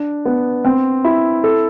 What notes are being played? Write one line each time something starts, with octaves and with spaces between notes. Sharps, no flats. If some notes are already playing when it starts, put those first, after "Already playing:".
Already playing: D4
B3
C4
E4
A4